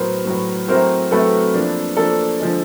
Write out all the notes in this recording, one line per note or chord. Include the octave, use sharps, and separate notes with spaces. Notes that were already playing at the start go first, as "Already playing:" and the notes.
Already playing: A2 F#3 B3 A#4 C5
A2 F#3 B3
F#3 A3 C4 E4 A#4 C5
F#3 A3 C4 E4 A4 B4
F3 A#3 D4
F3 A#3 D4 A4
D3 F3 G#3